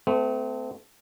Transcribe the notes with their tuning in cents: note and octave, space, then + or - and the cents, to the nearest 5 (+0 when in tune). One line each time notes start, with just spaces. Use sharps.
A3 +0 C4 -40